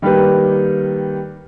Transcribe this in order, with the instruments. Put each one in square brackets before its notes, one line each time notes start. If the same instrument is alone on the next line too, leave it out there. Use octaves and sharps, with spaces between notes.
[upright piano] D#3 G3 A#3 G4 B4